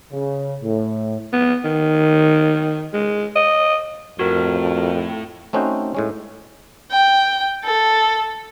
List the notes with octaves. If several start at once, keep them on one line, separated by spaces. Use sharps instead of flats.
C#3
A2
B3
D#3
G#3
D#5
F2 A2 F#4 A#4
A3 C4 C#4 D#4 F#4 C5
A2 G#3 C#4
G5
A4